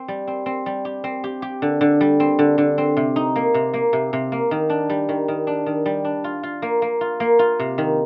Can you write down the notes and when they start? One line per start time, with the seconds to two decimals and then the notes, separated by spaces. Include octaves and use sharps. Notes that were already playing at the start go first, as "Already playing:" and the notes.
Already playing: C4
0.08 G3
0.27 C4
0.46 C4
0.66 G3
0.85 G4
1.04 C4
1.24 G4
1.42 G4
1.62 D3
1.81 D3
2.01 G3
2.20 C4
2.39 D3
2.58 D3
2.78 C4
2.97 C3
3.16 D#4
3.36 A#3
3.54 C3
3.74 A#3
3.93 C3
4.13 C3
4.32 A#3
4.51 D#3
4.70 D4
4.90 G3
5.09 D#3
5.28 D#3
5.47 D4
5.66 D#3
5.86 G3
6.05 D4
6.24 F4
6.43 F4
6.62 A#3
6.82 A#3
7.01 F4
7.20 A#3
7.39 F4
7.60 C3
7.78 D#3